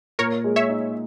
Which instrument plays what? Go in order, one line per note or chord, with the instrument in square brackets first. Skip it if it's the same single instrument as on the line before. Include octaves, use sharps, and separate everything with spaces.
[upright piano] A#2 [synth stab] A#4 C#5
[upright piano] G#3
[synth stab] C#5 E5
[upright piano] D#4